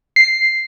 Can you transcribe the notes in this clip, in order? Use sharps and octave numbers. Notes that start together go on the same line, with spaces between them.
C7